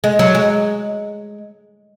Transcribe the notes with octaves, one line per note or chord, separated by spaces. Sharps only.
G#3
F#3
G#3